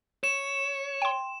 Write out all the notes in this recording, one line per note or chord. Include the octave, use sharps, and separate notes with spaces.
C#5 E7
G5 C6